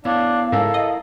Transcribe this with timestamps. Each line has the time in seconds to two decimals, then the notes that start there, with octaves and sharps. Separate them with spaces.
0.05 B3 D4 E4 C#5 F5
0.52 G#2 C#3 E4 A4 A#4
0.74 D#5